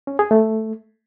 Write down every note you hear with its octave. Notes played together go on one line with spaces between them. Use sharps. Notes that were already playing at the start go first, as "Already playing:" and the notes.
C#4
G#4
A3